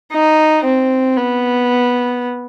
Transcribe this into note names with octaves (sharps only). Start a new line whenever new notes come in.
D#4
C4
B3